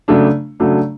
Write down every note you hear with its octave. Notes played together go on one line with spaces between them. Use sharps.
C#3 F#3 A3 D4
C#3 F#3 A3 D4